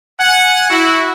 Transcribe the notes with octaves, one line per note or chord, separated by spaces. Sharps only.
F#5 G#5
E4 F#4